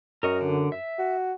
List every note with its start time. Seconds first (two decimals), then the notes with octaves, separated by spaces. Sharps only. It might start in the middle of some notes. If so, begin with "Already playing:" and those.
0.23 F#2 A#4 D#5 C#6
0.41 D3
0.72 E5
0.98 F#4